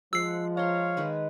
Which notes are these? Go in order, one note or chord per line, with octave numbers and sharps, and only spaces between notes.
F3 G#3 F#5 E6 C7
C#5 F5 A#5 C6
D#3 G#3 B4